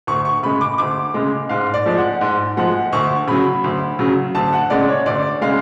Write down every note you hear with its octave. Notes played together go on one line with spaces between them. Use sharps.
D2 C#6
C#6
C#3 G#3 B5
D6
D2 D6
C#3 G#3
G#2 F5
D5
F3 G#3
F#5
G#2
F3 G#3 F#5
D2 C#6
C#3 F#3 B5
D2
C#3 F#3
D2 A5
F#5
C#3 G#3 D5
C#5
D2 D5
C#3 G#3 F5